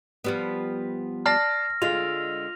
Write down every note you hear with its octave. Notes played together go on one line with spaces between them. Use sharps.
F3 G3 B3
D5 A5 F6 A#6 C7
D3 G#3 F4 F7